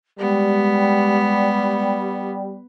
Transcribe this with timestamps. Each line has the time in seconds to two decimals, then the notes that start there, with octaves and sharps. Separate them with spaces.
0.20 G3 G#3 B3